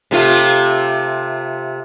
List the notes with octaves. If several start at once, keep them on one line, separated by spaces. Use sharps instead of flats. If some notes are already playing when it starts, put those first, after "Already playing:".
C3 A3 F4